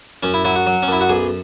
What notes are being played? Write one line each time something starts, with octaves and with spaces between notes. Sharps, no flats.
F#2 C#4
E4
F#3 E4
F#4
F#3
C#4
F#2 E4
F#4
B1 G#4